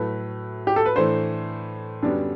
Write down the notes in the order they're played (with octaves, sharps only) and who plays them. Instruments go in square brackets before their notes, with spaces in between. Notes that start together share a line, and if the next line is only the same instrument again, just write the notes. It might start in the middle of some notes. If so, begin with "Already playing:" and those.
Already playing: [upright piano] A2 F#3 A3 [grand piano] B4
[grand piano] G4
A4
B4
[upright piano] A2 E3 A3 D4 [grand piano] C5
[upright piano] F#2 D3 G3 B3 F#4 [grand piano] D4